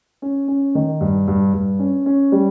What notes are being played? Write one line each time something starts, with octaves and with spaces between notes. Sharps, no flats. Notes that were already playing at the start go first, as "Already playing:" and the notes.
C#4
C#4
D#3
G2
G2
G2
C#4
C#4
G3